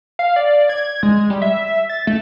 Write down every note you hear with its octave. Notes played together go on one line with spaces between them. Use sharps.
F5
D5
G#6
G#3
G3
E5
A6
A3